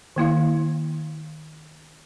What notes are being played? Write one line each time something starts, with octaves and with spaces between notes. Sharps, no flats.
D#3 A#3 E4 F5